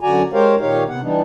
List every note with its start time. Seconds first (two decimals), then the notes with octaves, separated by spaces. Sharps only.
0.01 F#2 D3 F#4 D5 G#5 A#5
0.33 G#3 G4 A#4 C5 C#5 F5
0.60 A#2 D#3 D#4 G4 C#5 F5
0.89 C3 B3 F#5
1.02 E3 G3 B3 D4 D#4